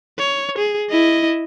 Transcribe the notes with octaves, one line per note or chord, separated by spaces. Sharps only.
C#5
G#4
E4 D#5